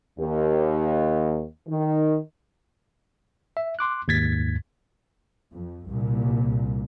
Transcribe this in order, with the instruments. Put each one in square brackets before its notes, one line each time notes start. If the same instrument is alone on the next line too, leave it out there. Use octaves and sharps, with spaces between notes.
[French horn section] D#2
D#3
[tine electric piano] E5
C6 D6 F#6
D#2 G#2 G#6 A6 B6
[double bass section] F2
C2 A#2